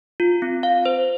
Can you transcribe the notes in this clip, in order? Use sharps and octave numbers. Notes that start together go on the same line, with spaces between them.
F4
C4
F5
C5